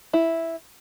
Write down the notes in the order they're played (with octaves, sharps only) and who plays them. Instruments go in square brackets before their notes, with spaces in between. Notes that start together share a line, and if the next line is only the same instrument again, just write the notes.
[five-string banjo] E4